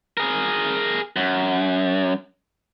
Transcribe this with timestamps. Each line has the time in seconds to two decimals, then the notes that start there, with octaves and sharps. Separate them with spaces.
0.17 G#4 A#4
1.16 F#2